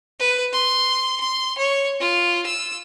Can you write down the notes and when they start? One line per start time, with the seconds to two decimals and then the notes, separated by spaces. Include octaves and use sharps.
0.20 B4
0.53 C6
1.20 C6
1.58 C#5
2.00 F4
2.46 E6